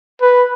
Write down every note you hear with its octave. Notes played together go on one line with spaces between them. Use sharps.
B4